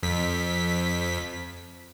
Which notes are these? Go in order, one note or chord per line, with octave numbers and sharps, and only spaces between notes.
F2 B6